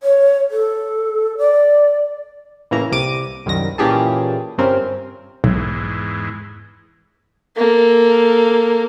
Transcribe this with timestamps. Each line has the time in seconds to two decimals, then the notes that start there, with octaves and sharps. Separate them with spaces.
0.03 C#5
0.51 A4
1.38 D5
2.71 A1 C#3 E3 A#3 E4 A#5
2.91 C2 C3 D6 D#7
3.46 C2 F#2 D#3 A#6
3.78 A#2 E3 C#4 G4 G#4 A5
4.58 G1 G2 C3 C4 C#4 A#4
5.44 B1 E2 G#2
7.56 A#3 A4